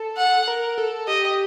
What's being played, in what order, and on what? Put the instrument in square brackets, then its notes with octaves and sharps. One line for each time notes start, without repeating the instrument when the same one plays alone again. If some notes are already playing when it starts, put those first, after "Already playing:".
Already playing: [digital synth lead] A4
[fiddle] F#5
[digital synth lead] A#4
A4
[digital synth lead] G4 [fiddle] D#5